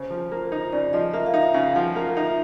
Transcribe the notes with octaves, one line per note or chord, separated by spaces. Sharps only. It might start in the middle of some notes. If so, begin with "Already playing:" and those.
Already playing: C#3 C5
F3
A#3
D#4
C#3 D5
F3 D#5
A#3 E5
F5
D#4 E5
C#3 F5
F3 F#5
A#3 F5
D#4 E5